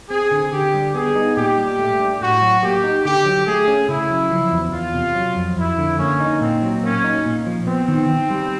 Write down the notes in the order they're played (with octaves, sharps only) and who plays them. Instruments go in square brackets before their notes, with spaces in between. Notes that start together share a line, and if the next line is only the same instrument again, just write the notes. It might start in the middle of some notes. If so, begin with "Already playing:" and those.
[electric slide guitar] C4 [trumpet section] G#4
[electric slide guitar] D3
[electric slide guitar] D3 [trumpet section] G4
[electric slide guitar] G3
[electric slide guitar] B3 [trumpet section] G#4
[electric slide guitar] D#4
[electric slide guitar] A#2 [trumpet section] G4
[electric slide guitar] G3
A3
D4
[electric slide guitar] A2 [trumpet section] F#4
[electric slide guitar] F#3
[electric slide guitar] A#3 [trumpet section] G4
[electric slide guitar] D#4
[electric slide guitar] D3 [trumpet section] G4
[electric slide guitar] F#3
[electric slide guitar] A3 [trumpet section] G#4
[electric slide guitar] C#4
[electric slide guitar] C#3 [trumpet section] E4
[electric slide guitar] F#3
F3
E2
[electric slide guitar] E2 [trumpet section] F4
[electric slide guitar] C3
F#3
F2
[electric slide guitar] F2 [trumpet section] E4
[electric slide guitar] D3
[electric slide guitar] A#3 [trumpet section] C#4
[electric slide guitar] D#4
[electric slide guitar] A#2 [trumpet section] C4
[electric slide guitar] F#3
[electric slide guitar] A#3 [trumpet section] C#4
[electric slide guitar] D#4
A#2
F3
[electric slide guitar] B3 [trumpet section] C4
[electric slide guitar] D#3
D#3
G3